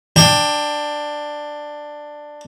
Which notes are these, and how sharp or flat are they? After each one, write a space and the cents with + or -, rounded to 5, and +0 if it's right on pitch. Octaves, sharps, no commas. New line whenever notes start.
D4 +10 G5 +25